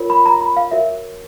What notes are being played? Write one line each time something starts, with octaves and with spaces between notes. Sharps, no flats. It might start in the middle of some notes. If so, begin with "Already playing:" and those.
Already playing: F4 A#4 C#5
B5
A#5
B5
F5
F#4 A#4 C#5 E5